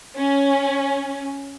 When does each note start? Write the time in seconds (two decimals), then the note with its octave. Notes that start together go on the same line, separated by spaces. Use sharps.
0.18 C#4